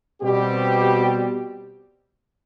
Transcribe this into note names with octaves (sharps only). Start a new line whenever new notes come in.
B2 G3 C4 G4